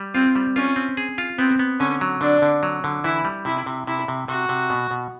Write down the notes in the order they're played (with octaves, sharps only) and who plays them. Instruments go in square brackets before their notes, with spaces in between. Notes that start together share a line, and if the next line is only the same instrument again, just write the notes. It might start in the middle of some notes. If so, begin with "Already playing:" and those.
Already playing: [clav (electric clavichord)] G3
[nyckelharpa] C4 [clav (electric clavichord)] F4
[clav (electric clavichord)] G3
[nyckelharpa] C#4 [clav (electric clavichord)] F4
[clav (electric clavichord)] C4
G#4
F4
[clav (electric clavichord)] B3 [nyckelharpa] C4
[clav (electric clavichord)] B3
[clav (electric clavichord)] D3 [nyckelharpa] C#4
[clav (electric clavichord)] F#3
[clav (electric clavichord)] D3 [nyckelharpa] D4
[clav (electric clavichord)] D3
F#3
D3
[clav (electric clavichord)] E3 [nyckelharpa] E4
[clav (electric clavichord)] G3
[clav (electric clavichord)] C3 [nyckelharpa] E4
[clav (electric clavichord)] C3
[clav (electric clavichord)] C3 [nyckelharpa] E4
[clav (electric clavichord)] C3
[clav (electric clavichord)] C3 [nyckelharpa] F#4
[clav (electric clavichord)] C3
B2
B2